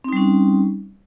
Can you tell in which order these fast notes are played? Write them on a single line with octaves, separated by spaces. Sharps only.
C4 D#4 G3 C#4